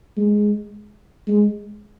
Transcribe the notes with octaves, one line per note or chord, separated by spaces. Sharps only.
G#3
G#3